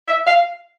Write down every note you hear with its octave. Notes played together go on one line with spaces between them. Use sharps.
E5
F5